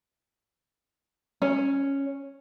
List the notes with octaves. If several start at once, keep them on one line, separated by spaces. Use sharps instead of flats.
C#4